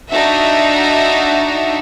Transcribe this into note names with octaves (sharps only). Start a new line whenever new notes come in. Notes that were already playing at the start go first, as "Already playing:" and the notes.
D4 D#4 F#4 E5